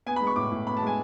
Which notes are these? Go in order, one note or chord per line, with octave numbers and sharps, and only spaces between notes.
B3 G#5
B5
G#3
C#6
A2 D6
A2
B3 B5
A5
G#3 G#5